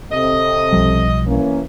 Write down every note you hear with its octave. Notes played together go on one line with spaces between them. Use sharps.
C3 C4 A4 D#5
B1 F3 G3
E3 A#3 C#4